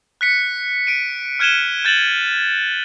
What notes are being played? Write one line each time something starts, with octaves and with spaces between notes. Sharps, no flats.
F#6 B6 C#7
D7 D#7
F6 F#6 G#6 D#7 E7 G7
G6 A6 E7 F#7 G7